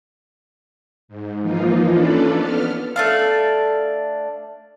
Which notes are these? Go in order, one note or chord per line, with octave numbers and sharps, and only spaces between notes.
G#2
E3 F3 A#3 D#4 F4
C#4 D4 F4 A4 B4 D5
B3 F6
A3 D4 F5